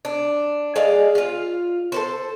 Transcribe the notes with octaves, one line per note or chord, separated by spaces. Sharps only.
D4
G#3 G#4 D5 F5
F4 F5
A4 B4 C5